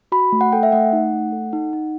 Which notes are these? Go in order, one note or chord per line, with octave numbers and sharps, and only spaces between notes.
F#4 B5
A3
F#5
A4 G5
E5
A3 F#5
D#4
A3
A4
D#4
D#4